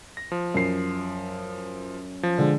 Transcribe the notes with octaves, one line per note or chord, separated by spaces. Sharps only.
A#6
F3
F#2 C7
F3
D3 G#3